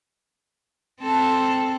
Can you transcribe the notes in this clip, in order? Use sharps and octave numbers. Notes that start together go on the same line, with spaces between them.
C4 A4